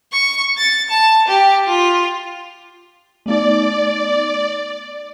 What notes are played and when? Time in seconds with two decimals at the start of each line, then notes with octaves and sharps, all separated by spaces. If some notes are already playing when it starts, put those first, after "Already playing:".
0.12 C#6
0.57 A6
0.90 A5
1.27 G4
1.66 F4
3.26 A3 B3 D#4 D5